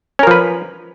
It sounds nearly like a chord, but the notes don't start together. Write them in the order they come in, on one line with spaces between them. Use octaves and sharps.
C#4 A#4 F3 B4